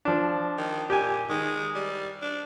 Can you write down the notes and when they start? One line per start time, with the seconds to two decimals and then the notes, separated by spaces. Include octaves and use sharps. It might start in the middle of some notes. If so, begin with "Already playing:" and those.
0.05 F3 D4
0.58 D#3
0.90 A#2 G4 G#5
1.29 D#3 G#3
1.75 G3
2.22 D4